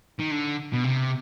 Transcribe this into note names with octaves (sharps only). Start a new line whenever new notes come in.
D#3
D3
B2
C3